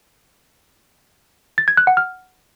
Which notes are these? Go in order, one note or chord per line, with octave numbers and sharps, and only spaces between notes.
A6
G#6
F#6
F#5
F6